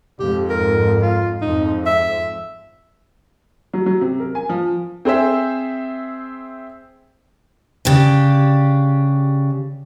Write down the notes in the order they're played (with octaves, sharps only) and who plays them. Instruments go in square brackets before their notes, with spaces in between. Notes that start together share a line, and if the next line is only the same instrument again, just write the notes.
[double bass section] F2 G#2 [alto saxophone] G4
[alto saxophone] A#4
F4
[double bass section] F2 G#2 [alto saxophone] D#4
[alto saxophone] E5
[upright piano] F#3
F#3
C3
A#4
G#5
F3
C4 G#4 C5 E5
[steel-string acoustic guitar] C#3 D4 G4